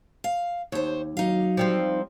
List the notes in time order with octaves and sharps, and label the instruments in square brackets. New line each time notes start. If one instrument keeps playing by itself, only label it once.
[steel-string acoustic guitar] F5
[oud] D#2 [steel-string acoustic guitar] C5 C#5
[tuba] F#3 [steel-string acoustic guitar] D#4 F5
[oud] F3 G3 C4